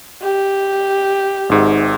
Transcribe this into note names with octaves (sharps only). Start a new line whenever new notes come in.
G4
G#1 G#2